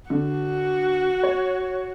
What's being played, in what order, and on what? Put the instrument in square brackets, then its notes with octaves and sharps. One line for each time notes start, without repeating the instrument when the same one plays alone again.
[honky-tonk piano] D3 [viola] F#4
[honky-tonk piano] C#5